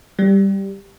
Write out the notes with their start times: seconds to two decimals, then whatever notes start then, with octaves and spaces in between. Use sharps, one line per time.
0.19 G3